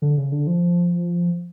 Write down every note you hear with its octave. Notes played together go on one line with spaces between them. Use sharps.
D3
C#3
D3
F3